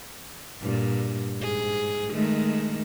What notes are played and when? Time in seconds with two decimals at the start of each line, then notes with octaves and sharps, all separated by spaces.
0.62 G2 A#2
1.37 G#2 G#4
2.11 D#3 G#3 A3